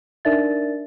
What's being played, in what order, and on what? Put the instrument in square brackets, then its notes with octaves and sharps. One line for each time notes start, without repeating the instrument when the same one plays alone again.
[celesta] D4 D#4 A#4 D5 E5 A6